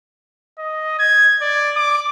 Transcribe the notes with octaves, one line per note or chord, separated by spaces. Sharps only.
D#5
G#6
D5
D6